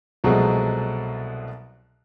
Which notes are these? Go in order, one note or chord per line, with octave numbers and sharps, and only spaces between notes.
C2 B2 F3 F#3 G#3 A3